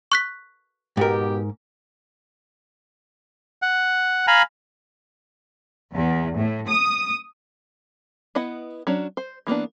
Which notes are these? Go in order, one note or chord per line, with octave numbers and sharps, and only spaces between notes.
C#6 F#6 B6
G#2 B2 G4 A#4
F#5
F5 G#5 A#5 B5
E2
A2
D#6
B3 E4 D#5 F#5
F#3 C#4 D4
C5
E3 A#3 B3 D4